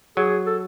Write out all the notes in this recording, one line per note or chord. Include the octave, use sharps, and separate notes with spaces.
F#3 G#4
A4